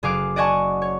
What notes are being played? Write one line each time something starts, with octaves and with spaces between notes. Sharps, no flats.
F#1 G#4 F5 D6 F#6 D7
D5 D#5 F#5 G#5 A5 C#6
C#5